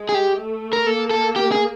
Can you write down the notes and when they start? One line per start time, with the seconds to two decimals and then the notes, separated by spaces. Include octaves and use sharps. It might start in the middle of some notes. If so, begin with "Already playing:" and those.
Already playing: G#3
0.09 G#4
0.14 G4
0.39 A3
0.73 A#4
0.87 A#3 A4
1.11 A4
1.36 G4
1.52 G#4